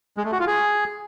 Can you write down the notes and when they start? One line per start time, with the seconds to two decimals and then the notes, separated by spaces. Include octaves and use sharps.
0.17 G#3
0.25 A3
0.32 F#4
0.40 F4
0.47 G#4